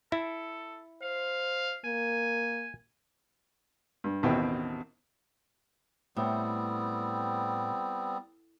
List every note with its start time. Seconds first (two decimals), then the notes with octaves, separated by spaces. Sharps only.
0.12 E4 A4
1.02 C5 F5
1.85 A#3 G#5
4.04 G2
4.23 A1 D#2 B2 C4 E4 G5
6.17 A2 G3 B3 C4